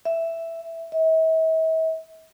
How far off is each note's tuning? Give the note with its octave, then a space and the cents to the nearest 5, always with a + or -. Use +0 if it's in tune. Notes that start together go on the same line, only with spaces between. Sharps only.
E5 +5
E5 -45